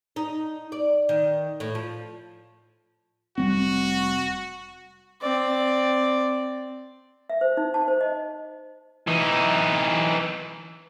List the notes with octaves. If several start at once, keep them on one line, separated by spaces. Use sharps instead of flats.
D#4
D5
D#3
A2
F3
F1 G3 C4 F#4
C4 D5
E5
C5
D#4
A5
C5
D#5
E3 D#4